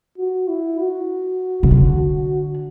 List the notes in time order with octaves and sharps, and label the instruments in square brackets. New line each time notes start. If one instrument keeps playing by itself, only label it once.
[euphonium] F#4
E4
F#4
[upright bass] C#3
D3